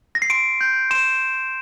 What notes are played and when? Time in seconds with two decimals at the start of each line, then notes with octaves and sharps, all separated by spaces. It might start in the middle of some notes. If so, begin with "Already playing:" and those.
0.15 A#6
0.22 C7
0.30 C6 D7
0.61 G6
0.91 C6 E7